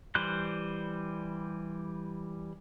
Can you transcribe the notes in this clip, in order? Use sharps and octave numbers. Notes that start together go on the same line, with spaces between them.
E3 G3 C5 F#6